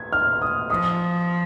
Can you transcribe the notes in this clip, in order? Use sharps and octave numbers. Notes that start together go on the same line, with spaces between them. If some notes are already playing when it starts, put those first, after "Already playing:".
Already playing: G#6
F6
D#6
F3 D#6